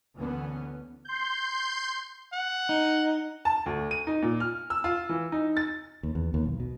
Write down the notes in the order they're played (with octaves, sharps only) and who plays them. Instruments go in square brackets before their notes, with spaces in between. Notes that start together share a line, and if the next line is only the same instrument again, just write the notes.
[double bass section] D2 D3 E3 B3 C#4
[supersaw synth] C6 G6
[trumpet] F#5
[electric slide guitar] D#4
[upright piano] A5
D2
D#7
D#4
A#2
F6
E6
F4
E3
D#4
A6
[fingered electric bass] D#2
E2
D#2
B1
B2